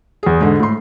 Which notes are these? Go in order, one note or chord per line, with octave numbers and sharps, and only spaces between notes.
E2 G#4
G#2 D3
A2 C6